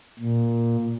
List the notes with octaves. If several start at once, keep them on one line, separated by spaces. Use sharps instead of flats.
A#2